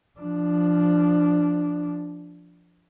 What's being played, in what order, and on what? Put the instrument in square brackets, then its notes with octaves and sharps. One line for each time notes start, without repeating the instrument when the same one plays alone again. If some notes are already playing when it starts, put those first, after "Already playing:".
[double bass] F3 D4